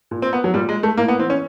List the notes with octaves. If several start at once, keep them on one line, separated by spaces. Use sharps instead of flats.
A#2
C4
B3
F#3
A#2 G3
G#3
A3
A2 A#3
B3
E3 C4
C#4